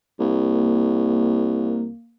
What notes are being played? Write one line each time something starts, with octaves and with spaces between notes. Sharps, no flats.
C2 A#3